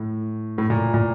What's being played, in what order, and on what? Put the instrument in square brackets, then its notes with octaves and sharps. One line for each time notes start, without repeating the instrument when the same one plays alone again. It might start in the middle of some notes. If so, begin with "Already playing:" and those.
Already playing: [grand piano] A2
A2
A#2
A#2